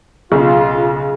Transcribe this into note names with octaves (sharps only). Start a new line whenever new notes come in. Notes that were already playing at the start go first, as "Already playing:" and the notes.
B1 C#3 F4 G#4